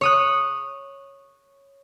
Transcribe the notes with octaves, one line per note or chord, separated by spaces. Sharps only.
C#5 D#6 F#6